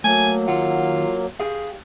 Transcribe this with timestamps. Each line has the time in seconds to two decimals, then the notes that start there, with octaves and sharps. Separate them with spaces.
0.04 F#3 A3 A#3 G#5
0.48 D#3 F4 F#5
1.40 G4 G#4 F5